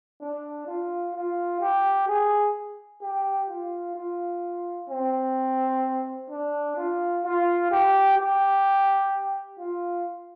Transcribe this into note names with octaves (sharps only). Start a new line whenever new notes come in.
D4
F4
F4
G4
G#4
G4
F4
F4
C4
D4
F4
F4
G4
G4
F4